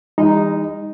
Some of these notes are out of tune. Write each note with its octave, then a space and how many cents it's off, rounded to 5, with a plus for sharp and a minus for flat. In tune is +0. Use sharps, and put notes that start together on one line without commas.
E3 +0 G#3 -45 D#4 +0